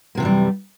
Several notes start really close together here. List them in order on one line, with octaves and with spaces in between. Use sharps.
A#3 C3 E3 F#2 G3